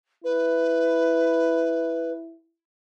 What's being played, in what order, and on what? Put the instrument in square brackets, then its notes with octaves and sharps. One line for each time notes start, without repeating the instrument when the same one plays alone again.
[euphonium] E4 [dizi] B4